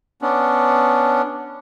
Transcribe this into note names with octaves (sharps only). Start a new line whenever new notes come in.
B3 C#4 D4